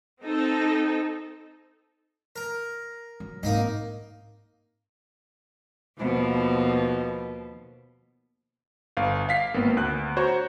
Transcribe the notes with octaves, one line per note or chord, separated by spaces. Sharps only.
C4 D#4 A4
A#4
F#3
G#2 A#3 C4 D#4 D#5
D#2 B2 F3
G1 F5
F5 B6 C7
G#1 A#3 B3
D2 F#6
F#4 C5 C#5 A#5 C#6